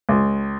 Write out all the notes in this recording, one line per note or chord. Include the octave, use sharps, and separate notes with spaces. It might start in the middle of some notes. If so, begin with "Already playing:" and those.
C#2